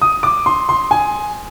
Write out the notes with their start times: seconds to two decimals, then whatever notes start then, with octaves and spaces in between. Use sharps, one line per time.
0.02 D#6
0.23 D6
0.46 C6
0.69 C6
0.91 G#5